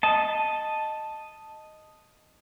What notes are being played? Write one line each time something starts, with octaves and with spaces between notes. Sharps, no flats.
D#5 A5